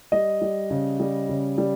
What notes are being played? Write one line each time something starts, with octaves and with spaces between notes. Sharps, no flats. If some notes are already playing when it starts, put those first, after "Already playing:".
G3 D#5
G3
C#3
G3
C#3
G3